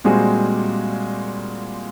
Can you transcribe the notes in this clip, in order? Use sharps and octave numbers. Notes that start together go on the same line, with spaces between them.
A#2 G3 G#3 C4 F#4 G#4